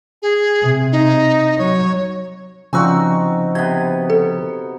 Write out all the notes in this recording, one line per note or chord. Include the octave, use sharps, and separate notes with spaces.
G#4
C3
D#4
F#3 C#5
C#3 F3 C4 D#4 F#4 G#5 C#6 E6
C3 B3 G#6
A4